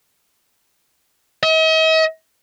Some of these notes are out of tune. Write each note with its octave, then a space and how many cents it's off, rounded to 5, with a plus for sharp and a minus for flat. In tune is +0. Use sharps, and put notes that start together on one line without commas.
D#5 +45